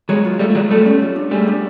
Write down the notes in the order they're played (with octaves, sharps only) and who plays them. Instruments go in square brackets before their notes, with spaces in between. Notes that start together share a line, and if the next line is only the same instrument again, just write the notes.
[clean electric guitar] F#3 G#3 [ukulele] C#5
[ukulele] F4
[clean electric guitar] G3 A3 [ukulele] F4
[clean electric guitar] A3
[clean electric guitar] F#3 G#3 [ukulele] D5
[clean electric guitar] G3 A3 [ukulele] A4
[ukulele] C#4
F4
D4
[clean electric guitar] G3 A3 [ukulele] G#4
[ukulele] D4